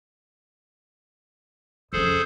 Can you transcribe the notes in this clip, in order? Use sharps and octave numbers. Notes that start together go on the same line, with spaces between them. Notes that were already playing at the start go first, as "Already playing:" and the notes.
F2 C#3 G#4 A4 C5